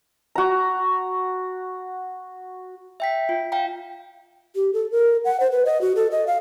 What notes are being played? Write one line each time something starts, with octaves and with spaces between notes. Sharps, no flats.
F#4 A#5
E5 G5 B6
F4
F5 G5 A#5
G4
A4
A#4
F#5
C5
B4
D#5
F#4
A4
D#5
F5